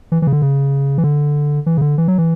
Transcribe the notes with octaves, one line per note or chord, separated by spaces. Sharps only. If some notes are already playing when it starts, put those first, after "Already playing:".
E3
E3
C#3
D3
C#3
E3
D3
E3
C#3
D3
E3
F#3
E3